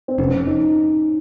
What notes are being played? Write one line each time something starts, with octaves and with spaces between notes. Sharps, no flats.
C4
F1 C#4
D#4